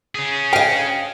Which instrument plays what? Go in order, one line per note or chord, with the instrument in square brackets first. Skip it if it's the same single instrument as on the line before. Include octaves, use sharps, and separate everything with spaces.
[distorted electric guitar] C#4 G#4
[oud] D#5 F5 [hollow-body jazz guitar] G5